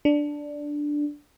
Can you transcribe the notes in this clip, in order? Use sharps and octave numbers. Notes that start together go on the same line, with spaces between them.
D4